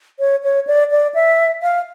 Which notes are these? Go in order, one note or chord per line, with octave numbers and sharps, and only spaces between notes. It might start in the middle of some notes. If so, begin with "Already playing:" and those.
C#5
C#5
D5
D5
E5
F5